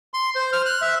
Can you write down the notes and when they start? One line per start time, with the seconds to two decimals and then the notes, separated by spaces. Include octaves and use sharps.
0.14 C6
0.35 C5
0.53 F6
0.66 F#6
0.82 E5